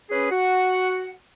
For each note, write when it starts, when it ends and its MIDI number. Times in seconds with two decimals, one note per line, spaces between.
0.10 0.28 61
0.10 0.28 68
0.10 0.28 71
0.31 1.11 66
0.31 1.11 78